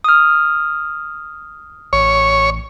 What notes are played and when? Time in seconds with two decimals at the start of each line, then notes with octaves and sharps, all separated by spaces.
0.04 D#6 F6
1.93 A1 C#5